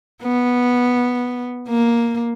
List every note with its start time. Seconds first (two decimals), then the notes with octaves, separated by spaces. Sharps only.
0.22 B3
1.68 A#3